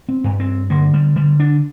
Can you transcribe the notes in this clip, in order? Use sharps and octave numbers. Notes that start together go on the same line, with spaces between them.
C4
G2
C4
D3 A#3
G3
D3 G3
D4